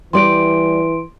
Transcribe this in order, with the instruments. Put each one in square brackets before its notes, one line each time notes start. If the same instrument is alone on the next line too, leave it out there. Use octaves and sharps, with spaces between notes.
[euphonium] E3 [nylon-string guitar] G3 D5 [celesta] C6 D7